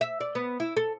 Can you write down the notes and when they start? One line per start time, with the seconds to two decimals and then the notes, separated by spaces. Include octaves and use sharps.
0.01 E5
0.20 D5
0.35 B3
0.60 E4
0.77 A4